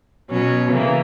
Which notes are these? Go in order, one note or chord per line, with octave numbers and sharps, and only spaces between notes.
B2 F#3 C#4
C#3 E3 A#3